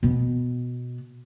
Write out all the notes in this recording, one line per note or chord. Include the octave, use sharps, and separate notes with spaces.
B2 B3